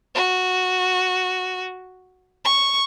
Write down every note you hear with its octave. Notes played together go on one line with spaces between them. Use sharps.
F#4
C#6